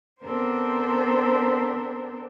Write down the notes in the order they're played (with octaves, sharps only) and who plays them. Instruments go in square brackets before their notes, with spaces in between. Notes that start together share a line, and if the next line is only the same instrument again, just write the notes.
[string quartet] B3 C4 D4 A4 A#4 C5